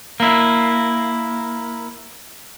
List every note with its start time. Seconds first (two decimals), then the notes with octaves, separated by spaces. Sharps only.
0.20 A#3 E4